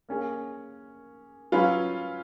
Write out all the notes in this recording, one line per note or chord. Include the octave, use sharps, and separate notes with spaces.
A#3 C#4 G#4
F#3 C#4 F4 B4